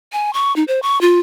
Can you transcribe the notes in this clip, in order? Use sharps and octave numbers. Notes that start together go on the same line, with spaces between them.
G#5
C#6
D#4
C5
C#6
F4